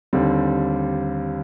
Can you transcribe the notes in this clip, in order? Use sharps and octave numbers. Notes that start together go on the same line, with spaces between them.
D#2 D3 G3 C4